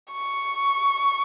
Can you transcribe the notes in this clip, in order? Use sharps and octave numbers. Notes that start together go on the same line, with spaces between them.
C#6